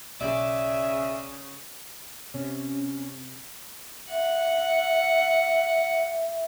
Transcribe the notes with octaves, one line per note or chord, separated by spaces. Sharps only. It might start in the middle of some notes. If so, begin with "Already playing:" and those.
B1 C#3 D5 E5
C3 C#4
E5 F#5